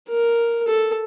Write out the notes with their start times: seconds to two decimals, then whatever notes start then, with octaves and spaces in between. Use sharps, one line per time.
0.09 A#4
0.68 A4